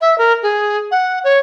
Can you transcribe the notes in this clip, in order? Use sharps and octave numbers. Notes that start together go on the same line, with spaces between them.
E5
A#4
G#4
F#5
C#5